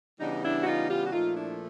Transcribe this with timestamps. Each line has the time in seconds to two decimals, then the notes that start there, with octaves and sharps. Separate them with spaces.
0.20 C#3 E3 G3 B3 D4 D#4
0.43 D4 E4
0.62 F#4
0.66 D#4 F4
0.89 F4 G4
1.04 F#4
1.12 A#2 F3 A3 D#4 F4
1.36 D4 E4